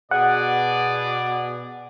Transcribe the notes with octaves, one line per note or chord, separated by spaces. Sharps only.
B2 G#4 D5 F#5